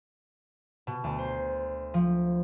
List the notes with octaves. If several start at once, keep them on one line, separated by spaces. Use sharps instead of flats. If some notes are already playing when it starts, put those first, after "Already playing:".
B2
D2
C5
F3